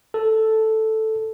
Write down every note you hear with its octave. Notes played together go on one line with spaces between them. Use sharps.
A4